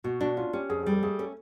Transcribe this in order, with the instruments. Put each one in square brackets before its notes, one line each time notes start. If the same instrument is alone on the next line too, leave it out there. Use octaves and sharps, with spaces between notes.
[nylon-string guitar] B2 [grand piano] F#4
[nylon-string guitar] D4 [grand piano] F#4
[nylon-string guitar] C#4 [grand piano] F4
[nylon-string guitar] C#4 [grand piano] G4
[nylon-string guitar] F2 [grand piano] G#4
[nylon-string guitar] G3 [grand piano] G#4
[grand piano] A4
[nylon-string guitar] A3 [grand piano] G#4
[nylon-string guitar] C#4 [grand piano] A4